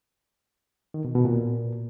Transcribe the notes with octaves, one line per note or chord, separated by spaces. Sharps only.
D#3
B2
B2
A#2